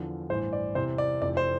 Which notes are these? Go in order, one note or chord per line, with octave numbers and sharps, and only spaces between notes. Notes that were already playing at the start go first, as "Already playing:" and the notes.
Already playing: E2 D3 F3
A1 G2 E3 C5
D5
E2 C3 E3 C5
D5
F1 F2 C3 E3 D5
C5